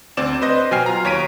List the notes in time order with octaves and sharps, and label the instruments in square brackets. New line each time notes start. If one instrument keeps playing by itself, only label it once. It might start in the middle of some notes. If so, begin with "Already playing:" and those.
[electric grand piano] D2 C4 D5 E7
B4 C5 D#5 A#6
B2 F#3 G5 G#5 F6 C7
F4 A#5
D#2 C#5 B6 D7 D#7